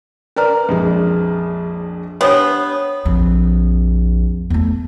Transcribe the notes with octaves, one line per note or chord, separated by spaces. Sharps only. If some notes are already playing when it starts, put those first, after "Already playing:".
C#4 A#4 B4 D5 A#5 F6
A#1 F2 G#3
B3 D4 G4 C5 C#5 D#6
A#1 F2
E2 A3